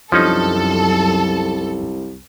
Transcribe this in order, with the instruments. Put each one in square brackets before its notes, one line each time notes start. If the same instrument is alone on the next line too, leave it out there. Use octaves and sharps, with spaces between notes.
[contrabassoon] C2 [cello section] F#2 [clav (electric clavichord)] F3 C#4 D#4 [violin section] A4